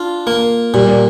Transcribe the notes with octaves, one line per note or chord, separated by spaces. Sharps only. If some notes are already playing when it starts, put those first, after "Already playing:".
Already playing: D4 F4
A#3
A#2 G3